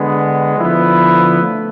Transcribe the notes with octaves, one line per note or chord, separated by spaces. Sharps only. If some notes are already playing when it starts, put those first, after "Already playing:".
Already playing: D3 G#3 B3
D3 F3 B3 E4
A3